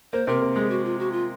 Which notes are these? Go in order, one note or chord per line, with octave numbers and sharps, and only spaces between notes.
A#3 C5
C3 C4 A#4
A#3
G#3 G#4
F#4
F4
F#4
F4